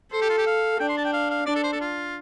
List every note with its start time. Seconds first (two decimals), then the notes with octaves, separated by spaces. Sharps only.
0.12 A4 C5
0.22 G4
0.30 F4
0.38 G4
0.47 F5
0.80 D4 G5
0.89 C6
0.97 A5
1.05 G5
1.13 F5
1.30 F5
1.46 D4 D5
1.56 A4
1.63 C5
1.72 A4
1.81 F4